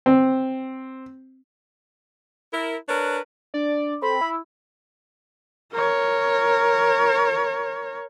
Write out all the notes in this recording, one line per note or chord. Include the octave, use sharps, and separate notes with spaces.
C4
E4 A#4
D4 A#4 B4 C#5
D4 D5
C4 A4 B5
E4 E6
A#4 C#5